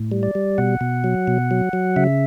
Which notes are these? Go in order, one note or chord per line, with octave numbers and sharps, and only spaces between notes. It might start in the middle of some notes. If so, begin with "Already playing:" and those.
Already playing: A2
G3
D5
G3
B2 F#5
B2
F#3
B2
F#3
F#3
C#3 E5